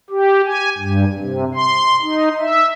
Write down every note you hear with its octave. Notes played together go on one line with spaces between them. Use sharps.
G4
G#5
G2
C3
C6
D#4
E5